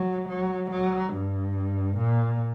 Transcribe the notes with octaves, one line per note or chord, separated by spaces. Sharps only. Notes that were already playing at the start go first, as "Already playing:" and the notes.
Already playing: F#3
F#3
F#3
G2
A#2